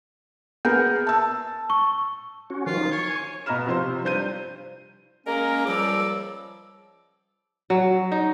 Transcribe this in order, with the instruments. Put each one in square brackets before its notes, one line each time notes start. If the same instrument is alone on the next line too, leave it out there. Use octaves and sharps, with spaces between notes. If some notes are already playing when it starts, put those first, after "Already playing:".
[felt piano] B3 G#4 A#4 [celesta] G6
[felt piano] A5 E6
[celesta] C#6
[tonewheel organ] C#4 F#4
[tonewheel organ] D#3 F3 [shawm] F4
[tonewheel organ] D#4
[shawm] C#5 [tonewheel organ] C#6
[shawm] G#5
[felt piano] B2 D#5 A#5 B5 F6 E7
C3 F3 C5 C6
G2 C5 G6 D#7
[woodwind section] G#3 A#3 C#4 A#4
C#2 F3 G3 D6 E6
[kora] F#3
D#4